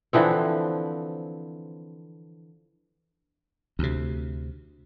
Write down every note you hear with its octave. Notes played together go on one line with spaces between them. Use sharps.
D3 E3 F3 C4
D2 C3